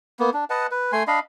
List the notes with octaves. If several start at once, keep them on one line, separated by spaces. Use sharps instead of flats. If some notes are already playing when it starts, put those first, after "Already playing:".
A#3 B3
D4
B4 D#5 F#5 A5
B4
A3 G#5 C6
D4 D#5 F5 B5